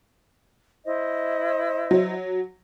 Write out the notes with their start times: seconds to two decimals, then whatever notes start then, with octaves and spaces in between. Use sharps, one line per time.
0.85 E4 C5 D#5
1.91 F#3